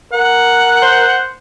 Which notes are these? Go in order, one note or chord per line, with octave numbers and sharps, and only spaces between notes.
A#4 F#5
C5